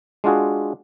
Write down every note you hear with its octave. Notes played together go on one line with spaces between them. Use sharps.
G#3 D4 F4 F#4 G#4